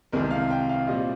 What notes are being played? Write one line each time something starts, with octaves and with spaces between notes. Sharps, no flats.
C2 C3 D#3 G#3 C4 A#4
F5
G5
F5
A#2 G3 C4 D#5